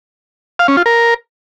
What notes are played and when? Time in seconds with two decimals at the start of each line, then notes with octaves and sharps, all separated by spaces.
0.59 F5
0.68 C#4
0.77 F4
0.86 A#4